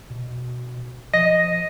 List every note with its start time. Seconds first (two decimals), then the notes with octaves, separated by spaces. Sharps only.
0.10 B2
1.14 F3 D#5 A#6